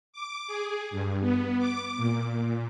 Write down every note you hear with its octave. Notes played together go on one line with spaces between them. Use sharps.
D6
G#4
G2
B3
D6
A#2